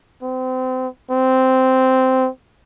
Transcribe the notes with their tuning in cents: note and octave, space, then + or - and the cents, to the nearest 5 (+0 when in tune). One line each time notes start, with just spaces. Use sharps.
C4 -30
C4 -10